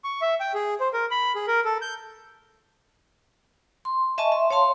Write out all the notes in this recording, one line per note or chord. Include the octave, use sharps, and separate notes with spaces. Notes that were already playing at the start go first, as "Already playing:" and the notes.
C#6
E5
G5
G#4
C5
A#4
B5
G#4
A#4
A4
G6
C6
D#5 E5 G#5 A5 C#6
E5 C6
C#5 F5 A5 C6